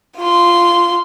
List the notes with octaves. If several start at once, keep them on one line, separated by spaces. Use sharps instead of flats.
F4 C6